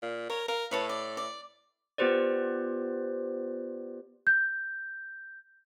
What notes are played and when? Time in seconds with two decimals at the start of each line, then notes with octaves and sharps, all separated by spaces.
0.02 A#2
0.30 A#4 C#5
0.48 A#4 F5
0.71 A2 B4 C#5 A5
0.89 D5
1.17 D5
1.98 B3 F4 G4 B4 C5 D5
4.27 G6